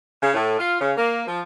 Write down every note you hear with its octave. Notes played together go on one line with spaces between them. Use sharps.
C#3
A2
F4
C#3
A#3
F3